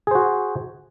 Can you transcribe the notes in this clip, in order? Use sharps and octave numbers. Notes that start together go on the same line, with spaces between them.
F#4 G#4 C5